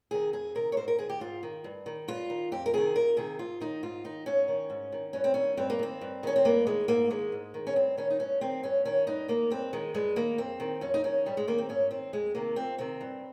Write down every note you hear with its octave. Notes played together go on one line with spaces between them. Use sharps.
C3 D#3 G#4
F2 G#4
C3 D#3 A#4
C#5
G#2 C5
A#4
D#3 G#4
G4
G#2 F4
D#3
G2
D#3
G2 F4
D#3
F2 G4
A#4
C3 D#3 G#4
F2 A#4
C3 D#3 G#4
G#2 F4
D#3 D#4
G#2 F4
D#3 D#4
G#2 C#4
D#3
G#2
D#3
G2 C#4
C4
D#3 C#4
G2 C4
A#3
D#3 C4
G2
D#3 C#4
C4
G2 A#3
D#3 G#3
G#2 A#3
D#3 G#3
G#2
D#3
C#4
G2 C4
D#3 C#4
D#4
G2 C#4
D#3 C4
G2 C#4
D#3 C#4
G2 D#4
D#3 A#3
G2 C4
D#3 G#3
G2 G#3
D#3 A#3
F2 C4
D#3
F2 C#4
D#4
D#3 C#4
G#2 G3
G#3
D#3 A#3
C4
G#2 C#4
D#3 C4
F2 G#3
C3 D#3 A#3
F2 C4
C3 D#3 C4
G2